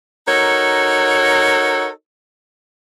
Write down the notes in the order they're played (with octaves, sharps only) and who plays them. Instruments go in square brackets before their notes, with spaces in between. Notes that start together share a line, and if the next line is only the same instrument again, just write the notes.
[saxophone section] D#4 F#4 A4 A#4 C#5